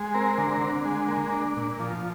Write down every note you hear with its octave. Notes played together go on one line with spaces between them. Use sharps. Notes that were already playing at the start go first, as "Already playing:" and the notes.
Already playing: G#3
C4 A#4
D3
D3
G#3
A#3
D4
A#2
F3